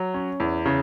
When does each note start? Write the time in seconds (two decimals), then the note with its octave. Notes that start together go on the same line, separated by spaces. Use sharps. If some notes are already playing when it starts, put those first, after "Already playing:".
Already playing: F#3
0.14 C#4
0.40 E2
0.66 C#3